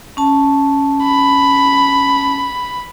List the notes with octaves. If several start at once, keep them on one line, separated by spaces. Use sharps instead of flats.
C#4 A5
B5